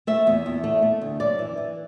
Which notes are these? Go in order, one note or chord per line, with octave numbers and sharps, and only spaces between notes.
A3 E5
E2
E2
A3
A3
D2
F#2 D5
E3
E3